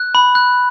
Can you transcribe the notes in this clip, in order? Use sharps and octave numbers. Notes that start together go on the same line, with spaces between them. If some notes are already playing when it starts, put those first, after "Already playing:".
Already playing: F#6
B5
F#6